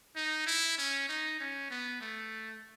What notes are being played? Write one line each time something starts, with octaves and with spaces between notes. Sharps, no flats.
D#4
E4
C#4
D#4
C#4
B3
A3